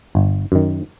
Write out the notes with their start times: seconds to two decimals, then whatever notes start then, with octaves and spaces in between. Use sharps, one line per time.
0.15 G1
0.52 F#2 D#3